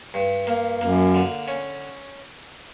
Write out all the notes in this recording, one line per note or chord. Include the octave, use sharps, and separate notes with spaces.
G2
A#3
F#2 A#3
D3
C#4